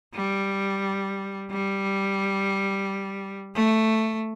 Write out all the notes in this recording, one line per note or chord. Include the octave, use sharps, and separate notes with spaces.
G3
G3
A3